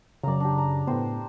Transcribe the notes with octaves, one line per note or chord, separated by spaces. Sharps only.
F#2 C#3 D5 A#5
D4 G4
A#5
A2 B3 C5 G5